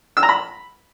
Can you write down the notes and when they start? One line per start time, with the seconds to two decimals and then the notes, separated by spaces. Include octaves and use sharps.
0.17 E6
0.23 A#5
0.29 B5